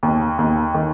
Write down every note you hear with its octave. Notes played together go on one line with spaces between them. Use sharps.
D#2
D#2
D#3